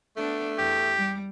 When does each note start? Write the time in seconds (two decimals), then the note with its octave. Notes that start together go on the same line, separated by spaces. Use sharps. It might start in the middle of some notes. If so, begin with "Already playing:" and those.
0.17 A3 B3 D4
0.58 E2 G4
0.97 G3